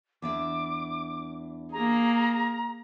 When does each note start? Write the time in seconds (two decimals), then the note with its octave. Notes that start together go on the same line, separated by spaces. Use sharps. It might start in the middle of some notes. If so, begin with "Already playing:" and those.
0.22 E2 D4 E5 D6
1.72 A#3 G#4 A#5